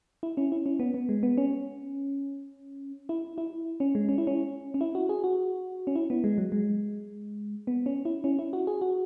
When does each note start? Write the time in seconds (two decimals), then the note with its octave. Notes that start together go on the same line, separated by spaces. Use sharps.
0.23 E4
0.37 C#4
0.52 E4
0.66 C#4
0.79 B3
0.94 B3
1.09 G#3
1.23 B3
1.37 C#4
3.09 E4
3.38 E4
3.80 C#4
3.95 G#3
4.09 C#4
4.18 E4
4.27 C#4
4.74 C#4
4.81 E4
4.95 F#4
5.09 G#4
5.24 F#4
5.87 C#4
5.96 E4
6.10 B3
6.24 G#3
6.38 F#3
6.52 G#3
7.67 B3
7.86 C#4
8.05 E4
8.24 C#4
8.39 E4
8.53 F#4
8.67 G#4
8.81 F#4